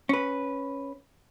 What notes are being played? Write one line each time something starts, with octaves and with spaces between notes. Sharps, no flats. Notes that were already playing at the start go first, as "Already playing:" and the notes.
C#4 B4